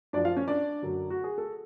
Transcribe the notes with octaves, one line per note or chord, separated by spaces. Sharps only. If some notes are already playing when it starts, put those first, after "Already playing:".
F#2 F3 D4 D5
F4 F5
C#4 C#5
D4 D5
F#2 D3 F#3
F#4
G#4
A4